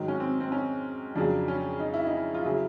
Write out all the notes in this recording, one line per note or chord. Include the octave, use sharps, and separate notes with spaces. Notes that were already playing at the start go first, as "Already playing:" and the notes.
Already playing: G#2 D#3 F#3
C#4
C4
C4
C#4
F2 C#3 F#3 D4
C#4
D#4
E4
D#4
F4
C#3 F#3 E4